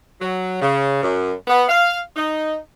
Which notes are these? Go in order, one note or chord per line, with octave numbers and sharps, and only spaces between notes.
F#3
C#3
F#2
B3
F5
D#4